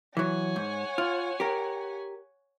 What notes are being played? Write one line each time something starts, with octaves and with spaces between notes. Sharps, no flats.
E3 F#3 C#5 F#5 G#5
G#2
F4
G4 A#4